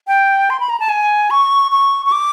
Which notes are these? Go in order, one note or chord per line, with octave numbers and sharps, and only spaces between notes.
G5
C6
B5
A#5
A5
G#5
C#6
C#6
C#6
D6